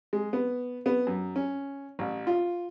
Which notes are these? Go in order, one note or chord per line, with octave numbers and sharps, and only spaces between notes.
G#3
B3
B3
F#2
C#4
A1
F4